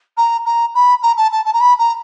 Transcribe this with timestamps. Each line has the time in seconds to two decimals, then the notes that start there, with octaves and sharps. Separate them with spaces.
0.17 A#5
0.45 A#5
0.74 B5
1.02 A#5
1.17 A5
1.31 A5
1.45 A5
1.53 A#5
1.60 B5
1.78 A#5